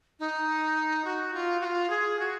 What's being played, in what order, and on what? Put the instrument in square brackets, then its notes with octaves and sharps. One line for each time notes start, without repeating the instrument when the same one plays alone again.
[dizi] D#4
F#4
F4
F#4
F4
G#4
F#4